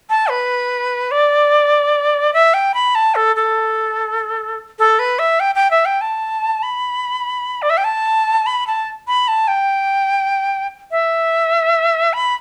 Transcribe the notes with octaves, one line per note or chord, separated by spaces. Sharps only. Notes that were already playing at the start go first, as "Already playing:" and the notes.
A5
B4
D5
E5
G5
B5
A5
A4
A4
A4
B4
E5
G5
G5
E5
G5
A5
B5
D5
E5
G5
A5
B5
A5
B5
A5
G5
E5
B5